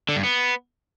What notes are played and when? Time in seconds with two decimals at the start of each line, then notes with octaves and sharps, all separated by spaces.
0.09 D3
0.16 G2
0.23 B3